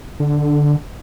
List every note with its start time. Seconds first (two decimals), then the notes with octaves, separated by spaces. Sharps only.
0.20 D3